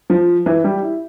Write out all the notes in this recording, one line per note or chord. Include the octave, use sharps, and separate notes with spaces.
F3
E3
G3
E4